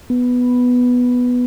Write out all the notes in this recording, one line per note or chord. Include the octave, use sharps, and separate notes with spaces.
B3